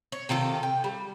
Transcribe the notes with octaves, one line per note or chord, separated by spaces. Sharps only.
C#5
C3 D#3 F4 A4
G5
G3